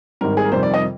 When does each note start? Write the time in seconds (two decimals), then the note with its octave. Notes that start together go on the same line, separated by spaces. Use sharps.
0.21 G#1 G#2 G3 A#4
0.37 G#4
0.45 A#4
0.52 F2 C3 D#3 G3 C5
0.63 D5
0.74 D#5